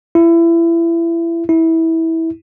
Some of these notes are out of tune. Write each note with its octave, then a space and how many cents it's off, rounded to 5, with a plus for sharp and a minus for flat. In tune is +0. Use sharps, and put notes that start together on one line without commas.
E4 +25
E4 -20